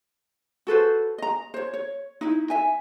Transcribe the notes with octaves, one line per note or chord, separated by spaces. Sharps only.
F#4 A4 B4 C5
D#5 A#5
C5 C#5
C#5
D#4 E4
E5 G#5